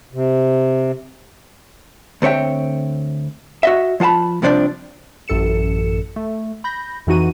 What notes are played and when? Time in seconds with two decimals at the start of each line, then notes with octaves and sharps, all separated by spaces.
0.13 C3
2.22 D2 C4 C#5 E5 G5
3.63 F#4 D#5 E5
4.00 F3 F4 F#5 A5 B5
4.42 C2 C3 F3 D4 C5 D5
5.28 A1 F#2 A4 C#7 E7
6.16 A3
6.64 B5 G6 A#6
7.07 F2 E3 D#4 F#4 D#7